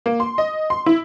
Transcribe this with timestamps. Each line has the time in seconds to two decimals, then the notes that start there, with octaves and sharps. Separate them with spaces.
0.06 A#3
0.20 C6
0.38 D#5
0.70 C6
0.86 E4